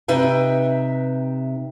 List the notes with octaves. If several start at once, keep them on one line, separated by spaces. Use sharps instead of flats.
C3 D#4 B4 E5 G5